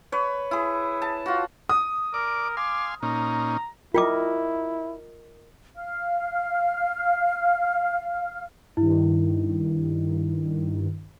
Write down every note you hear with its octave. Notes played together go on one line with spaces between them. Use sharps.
B4 C#5
E4 G#4
A5
F4 F#4
D#6
A#4 D5 D6
F5 G#5 C6 D6
A#2 C#4 D#4 A#5
E4 F4 A#4 D#5 G5 D6
F5 F6
G2 D#3 E4